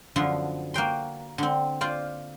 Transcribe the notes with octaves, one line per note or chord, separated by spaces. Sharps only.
F#2 D3 F3 B3 C6
A#3 F#4 G5 C6
D3 C4
F4 C5 D5